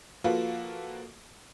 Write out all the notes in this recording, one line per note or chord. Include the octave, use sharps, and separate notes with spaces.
F3 A#3 F4 F#4 A4 B4